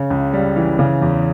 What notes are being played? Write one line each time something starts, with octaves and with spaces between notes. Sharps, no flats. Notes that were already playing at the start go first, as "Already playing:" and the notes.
Already playing: C#3 C#4
C#2
G3
E3
C#3
E2